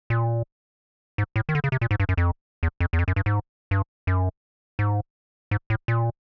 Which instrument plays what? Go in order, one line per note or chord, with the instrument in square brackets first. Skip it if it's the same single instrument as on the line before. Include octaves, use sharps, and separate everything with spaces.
[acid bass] A#2
G#2
A2
D#3
D3
C#3
C3
A#2
G#2
G2
F#2
F2
E2
F2
E2
F2
F#2
G2
G#2
G2
F#2
G#2
G#2
A2
A#2